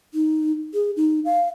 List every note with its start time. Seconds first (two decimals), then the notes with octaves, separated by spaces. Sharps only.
0.14 D#4
0.74 G#4
0.97 D#4
1.25 F5